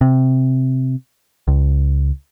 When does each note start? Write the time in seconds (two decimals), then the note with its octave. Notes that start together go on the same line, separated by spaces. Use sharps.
0.01 C3
1.48 C#2